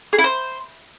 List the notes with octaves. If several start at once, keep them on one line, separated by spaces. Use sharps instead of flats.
G#4
E4
C5